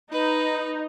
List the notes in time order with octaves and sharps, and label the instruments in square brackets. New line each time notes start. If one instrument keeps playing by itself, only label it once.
[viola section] D#4 [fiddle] B4